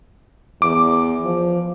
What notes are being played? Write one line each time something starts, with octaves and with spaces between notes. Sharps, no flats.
E2 D6
F3